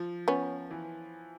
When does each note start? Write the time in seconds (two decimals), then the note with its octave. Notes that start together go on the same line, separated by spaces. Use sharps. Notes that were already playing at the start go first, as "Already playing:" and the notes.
Already playing: F3
0.28 B3 C#4
0.71 E3